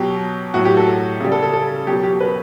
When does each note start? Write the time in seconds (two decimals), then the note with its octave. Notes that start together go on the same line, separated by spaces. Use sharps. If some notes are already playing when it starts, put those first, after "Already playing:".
Already playing: B2 F#3 G4
0.54 A2 F#3 F#4
0.65 G4
0.77 A4
1.20 C#3 G3
1.32 A4
1.43 A4
1.53 A4
1.87 B2 F#3 G4
2.04 G4
2.21 B4